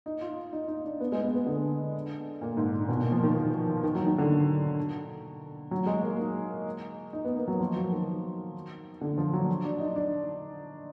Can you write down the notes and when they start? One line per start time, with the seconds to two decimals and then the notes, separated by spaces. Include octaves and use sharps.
0.06 D#4
0.21 F4
0.53 D#4
0.68 D#4
0.85 D4
1.01 B3
1.12 G#3
1.24 B3
1.35 B3
1.47 D3
2.41 A#2
2.57 G#2
2.89 B2
3.01 A#2
3.12 F3
3.23 D#3
3.36 F3
3.83 D#3
3.95 F#3
4.06 D#3
4.18 D3
5.71 F#3
5.86 G#3
6.03 A#3
6.19 D#4
7.13 D#4
7.25 B3
7.36 A#3
7.48 F#3
7.60 F3
7.76 F#3
7.92 D#3
9.01 D3
9.18 F3
9.33 F#3
9.65 D4
9.79 D#4
9.96 D4